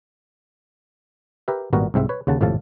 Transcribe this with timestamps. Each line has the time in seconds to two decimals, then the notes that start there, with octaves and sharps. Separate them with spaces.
1.48 G4 A#4 B4 E5
1.73 G#1 A#2 G3 B3 F#4 A#4
1.94 C2 G#2 C4 E5
2.09 B4 C#5
2.27 D#2 C#3 F#5 A5
2.41 G#1 F2 A2 C3 F5 A5